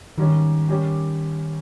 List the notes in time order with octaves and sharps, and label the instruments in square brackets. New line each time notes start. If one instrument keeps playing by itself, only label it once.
[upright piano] G#2 G3 C#4 [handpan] D#3
[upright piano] G3 C#4 G4